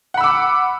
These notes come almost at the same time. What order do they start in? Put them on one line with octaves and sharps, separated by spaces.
F#5 B5 E6 D6